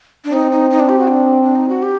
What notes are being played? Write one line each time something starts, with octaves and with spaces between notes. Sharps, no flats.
D4
C4 D#4
D#4
D#4
D4
G4
F#4
D4
D4
D#4
F#4
G4